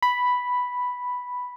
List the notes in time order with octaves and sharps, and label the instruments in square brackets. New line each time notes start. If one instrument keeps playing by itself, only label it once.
[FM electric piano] B5